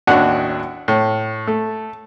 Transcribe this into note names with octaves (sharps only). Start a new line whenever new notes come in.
A1 D#2 D4 F#4 F#5
A2
A3